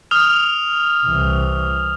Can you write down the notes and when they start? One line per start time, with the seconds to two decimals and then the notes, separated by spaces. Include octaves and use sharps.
0.11 D#6 F6 F7
1.06 C2 E3